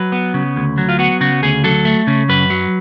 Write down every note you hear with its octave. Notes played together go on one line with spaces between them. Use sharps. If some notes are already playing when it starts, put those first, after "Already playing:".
Already playing: F#3 B4
B3
C#3
D2
F#3
F4
B3 F#4
C#3 F#4
D2 G#4
F#3 A4
A3
C#3
F#2 B4
F#3